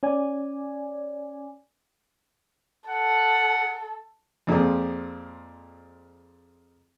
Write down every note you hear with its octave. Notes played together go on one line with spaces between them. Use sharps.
C#4 D5 G#5
A4 F#5
F2 A#2 F3 G#3 C4